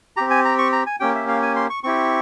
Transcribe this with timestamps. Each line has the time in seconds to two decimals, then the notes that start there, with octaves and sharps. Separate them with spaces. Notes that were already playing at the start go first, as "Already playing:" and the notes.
0.17 C4 G4 A#5
0.30 G#5
0.45 A#5
0.59 C#6
0.72 A#5
0.86 G#5
1.00 A#3 C#4 G4 G5
1.15 E5
1.28 F5
1.43 G#5
1.56 C6
1.70 C#6
1.84 C4 E4 G4 C#6